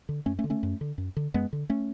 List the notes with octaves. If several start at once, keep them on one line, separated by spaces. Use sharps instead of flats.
D3
F#2 A3 C#4
A3 C#4
D3
A3 C#4
F#2
D3
F#2
D3
F#2 G#3 B3
D3
A3 C#4